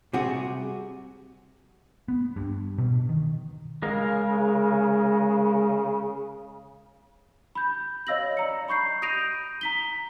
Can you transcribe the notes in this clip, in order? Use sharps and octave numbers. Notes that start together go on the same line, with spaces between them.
C3 G3 F#4 G#4
B3
G2
B2
D#3
C#3 G#3 A#4 F5
B5 G6
C#5 D#5 F5 E6 A#6 F#7
D5 A#5 C#7
B5 C#6 G6 C7
D#6 G6 A#6 D7 D#7 F7
A#5 B6 G7